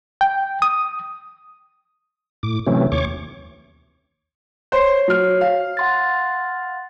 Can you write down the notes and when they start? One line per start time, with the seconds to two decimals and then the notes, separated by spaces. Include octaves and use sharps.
0.21 G5
0.62 D#6
2.43 A2 D6
2.66 C3 E3 F#3 A3 C4 C#4
2.92 D#2 C#5 C#6 D6
4.72 C5 C#5 C7
5.08 F#3 F6
5.41 F5
5.77 F#5 C6 A6